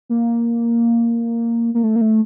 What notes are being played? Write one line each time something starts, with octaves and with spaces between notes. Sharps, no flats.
A#3
A#3
A3
A#3
A3